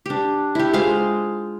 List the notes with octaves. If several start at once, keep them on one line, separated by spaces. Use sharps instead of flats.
D4 G4
E4 G4
G#3 F4 C5 F5